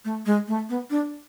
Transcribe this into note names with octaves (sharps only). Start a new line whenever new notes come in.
A3
G#3
A3
B3
D4